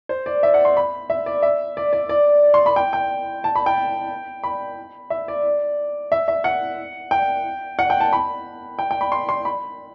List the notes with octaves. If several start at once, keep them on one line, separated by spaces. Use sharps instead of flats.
C5
D5
E5
F#5
C6
B5
E5
D5
E5
D5
D5
D5
C6
B5
G5
G5
A5
B5
G5
B5
E5
D5
E5
E5
F#5
G5
F#5
G5
A5
B5
G5
G5
B5
C6
C6
B5